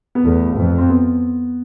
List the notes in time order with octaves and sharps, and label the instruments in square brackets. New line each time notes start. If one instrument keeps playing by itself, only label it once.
[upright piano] B3
[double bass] E2 [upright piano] A3
[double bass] F2
[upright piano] C4
B3